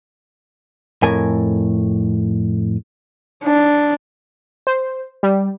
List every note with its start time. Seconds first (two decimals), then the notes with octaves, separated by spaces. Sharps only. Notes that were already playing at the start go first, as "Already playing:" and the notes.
1.03 F2 A2 A#4 G#5
3.43 D4
4.67 C5
5.23 G3